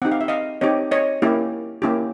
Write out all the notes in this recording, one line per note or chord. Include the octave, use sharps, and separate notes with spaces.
C4 D#4 G4 F#5
F5
E5
D#5 F5
C4 D#4 G4 C#5 D#5
C#5 D#5
A#3 C#4 E4 G4
A#3 C#4 E4 G4